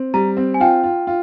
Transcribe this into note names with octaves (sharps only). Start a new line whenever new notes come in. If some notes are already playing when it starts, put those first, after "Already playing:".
Already playing: C4
G3 A#5
C4
G#5
F4 G5
F4
F4